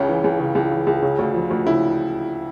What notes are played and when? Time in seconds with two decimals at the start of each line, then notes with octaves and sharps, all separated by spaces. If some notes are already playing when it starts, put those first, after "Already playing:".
Already playing: C#2 C#3 C#4
0.09 E3
0.24 C#2
0.39 C#3
0.55 C#2
0.71 E3
0.87 C#2
1.02 C#3
1.19 D2
1.34 F3
1.50 D2
1.66 C#3 E4